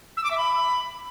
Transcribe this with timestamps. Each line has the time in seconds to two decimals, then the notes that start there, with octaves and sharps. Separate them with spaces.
0.17 E6
0.24 D6
0.31 E5
0.38 B5